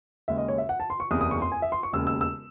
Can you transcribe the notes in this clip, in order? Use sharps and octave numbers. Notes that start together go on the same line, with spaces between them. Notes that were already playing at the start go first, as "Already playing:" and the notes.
D#2 C#3 G#3 C#4 E5
D#5
C#5
E5
F#5
A5
C6
C#6
F#1 E2 C3 D#6
D#6
C#6
C6
G#5
E5
C6
C#6
E1 D#2 C#3 E6
E6
E6